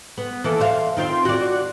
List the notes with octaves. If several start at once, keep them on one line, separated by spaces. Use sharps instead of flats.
B3
E3 A#3 A4
C5 E5 F5
D#3 C4 F4
F#4 D5